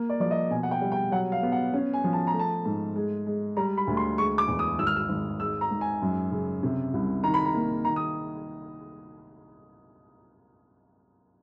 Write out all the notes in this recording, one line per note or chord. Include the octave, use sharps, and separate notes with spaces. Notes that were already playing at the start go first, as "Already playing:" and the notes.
Already playing: A#3
D5
F3 D5
D#5
B2 G#5
F#5
G5
G3
G5
F#3 F#5
F5
B3
F#5
C#4
G#5
F3
A5
A#5
A3
A5
G#2
G#3
G#3
G3 A#5
B5
D2
C6
G#3 C#6
D6
E2
D#6
G#1 E6
F6
E6
G#1
G#3 E6
A#5
G#2
G#5
F#2
C#3
C3
C2
D#3 A#5
B5
A#5
A#3
D#3 A#5
D#6